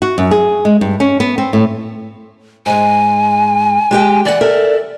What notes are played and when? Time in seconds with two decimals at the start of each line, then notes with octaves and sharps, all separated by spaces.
0.02 F#4
0.18 F#2
0.31 G#4
0.65 G#3
0.81 G2
1.00 C#4
1.20 B3
1.38 C4
1.53 A2
2.66 G#2 G#3 G#5
3.91 G#3 G4 G5
4.25 E3 D5 F#5
4.41 A4 A#4 E5